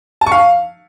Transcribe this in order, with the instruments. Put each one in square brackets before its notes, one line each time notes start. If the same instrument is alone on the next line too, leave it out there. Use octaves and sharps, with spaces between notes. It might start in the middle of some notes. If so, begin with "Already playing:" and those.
[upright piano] A5
C#6
F5